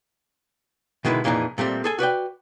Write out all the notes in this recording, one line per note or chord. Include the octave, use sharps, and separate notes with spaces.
B2 D3 D#3 G#3 E4 B4
F2 A#2 E3 D4 D#4 G#4
A#2 G3 A3 C4
G#4 A4 G#5
F#4 B4 D5 G5